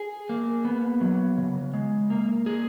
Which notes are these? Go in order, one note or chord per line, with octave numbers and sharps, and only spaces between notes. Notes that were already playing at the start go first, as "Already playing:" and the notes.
Already playing: G#4
A#3
B3
F#3
C#3
G#3
A#3
G#4